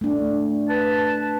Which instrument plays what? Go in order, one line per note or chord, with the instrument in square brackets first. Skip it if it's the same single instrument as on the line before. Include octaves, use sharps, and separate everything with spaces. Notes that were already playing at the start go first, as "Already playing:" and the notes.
[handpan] A3 D4
[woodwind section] B4 A5